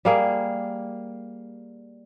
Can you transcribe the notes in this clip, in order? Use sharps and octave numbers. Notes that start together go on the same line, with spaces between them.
G3 A#3 G#4